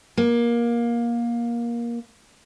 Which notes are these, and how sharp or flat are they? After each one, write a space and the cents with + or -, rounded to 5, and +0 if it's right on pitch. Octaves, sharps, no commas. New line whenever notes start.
A#3 +20